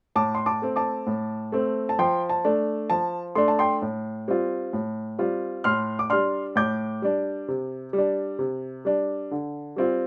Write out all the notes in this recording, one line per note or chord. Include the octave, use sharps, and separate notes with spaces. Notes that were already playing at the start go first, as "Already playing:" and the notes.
A2 A5 D6
C6
A5 D6
A3 C4
A5 D6
A2
A3 C4
A5
F3 G5 C6
A5
A3 D4
F3 A5
A3 D4 C6
A5
G5 C6
A2
G3 C4 F4
A2
G3 C4 F4
A2 C6 F6
D6
G3 D4 C6 F6
A2 D6 G6
G3 D4
C3
G3
D4
C3
G3 D4
D3
G3 C4 F4